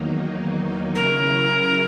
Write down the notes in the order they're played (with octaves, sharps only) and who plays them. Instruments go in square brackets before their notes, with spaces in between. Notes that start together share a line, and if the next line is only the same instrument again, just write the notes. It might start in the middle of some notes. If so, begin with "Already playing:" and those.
Already playing: [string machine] E2 D#3 F#3 A#3 D#4
[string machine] C#3 F#3 C#4 E4 [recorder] A#4